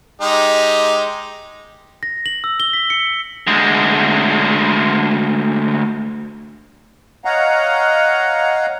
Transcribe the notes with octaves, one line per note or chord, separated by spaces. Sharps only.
G#3 D#4 G4
A#6
F#7
E6
G7
B6
C#7
D2 G#3
C#5 D#5 F5 F#5 A#5